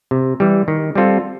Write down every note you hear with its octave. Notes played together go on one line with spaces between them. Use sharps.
C3
E3 G3
D#3
G3 C4 F4 A4